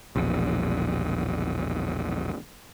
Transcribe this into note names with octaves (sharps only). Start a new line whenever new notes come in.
E1 A#1